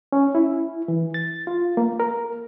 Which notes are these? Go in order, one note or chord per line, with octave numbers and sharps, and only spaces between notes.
C#4
E4
E3
A6
F4
A#3
A#4